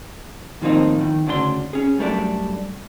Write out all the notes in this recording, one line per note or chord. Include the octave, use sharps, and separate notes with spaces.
A2 D#3 F3 A#3 C4 D#4
E2 D#3
D2 C#3 D4 C5 C6
C#4 G#4
F#2 G3 A3 C#4 D4